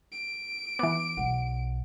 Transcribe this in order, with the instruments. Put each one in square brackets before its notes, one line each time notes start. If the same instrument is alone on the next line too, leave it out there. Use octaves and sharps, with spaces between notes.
[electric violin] D7
[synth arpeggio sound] E3 B3 [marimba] D6
[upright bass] B1 [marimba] F#5